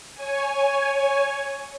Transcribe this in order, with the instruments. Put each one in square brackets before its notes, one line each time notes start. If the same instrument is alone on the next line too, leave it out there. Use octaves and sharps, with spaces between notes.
[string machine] C#5 G#5